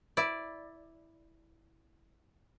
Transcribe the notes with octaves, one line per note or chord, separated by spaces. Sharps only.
E4 D5